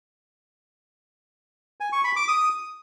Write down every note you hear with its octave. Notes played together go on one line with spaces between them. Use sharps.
G#5
C#6
B5
D6
D#6